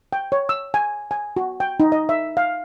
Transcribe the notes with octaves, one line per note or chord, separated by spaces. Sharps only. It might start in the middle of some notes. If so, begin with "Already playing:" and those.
G5
C#5
E6
G#5
G#5
F#4
G5
D#4
D#5
E5
F5